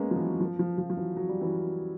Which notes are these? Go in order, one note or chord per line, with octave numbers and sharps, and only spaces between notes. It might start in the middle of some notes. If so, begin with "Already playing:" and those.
Already playing: G#3 A#3 B3 C#4
F3
E3 F#3
F3
F3
F3
F3
E3 F#3
F#3
G3
E3 F#3